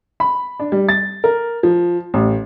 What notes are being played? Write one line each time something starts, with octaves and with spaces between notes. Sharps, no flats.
B5
D4
G3
A6
A#4
F3
A1